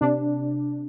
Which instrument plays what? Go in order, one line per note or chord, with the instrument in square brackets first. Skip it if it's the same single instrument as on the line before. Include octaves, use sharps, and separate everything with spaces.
[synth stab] C3 D4